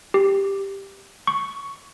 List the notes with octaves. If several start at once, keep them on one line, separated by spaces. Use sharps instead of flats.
G4
C#6